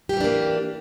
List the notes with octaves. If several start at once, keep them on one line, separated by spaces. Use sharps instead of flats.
E3 G3 A#3 D4 G4